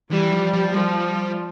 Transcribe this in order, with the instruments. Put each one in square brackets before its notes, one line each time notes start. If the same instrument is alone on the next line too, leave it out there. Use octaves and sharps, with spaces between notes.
[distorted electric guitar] E3 [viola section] G3
[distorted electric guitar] F3
F3
[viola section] F3 [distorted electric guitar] G3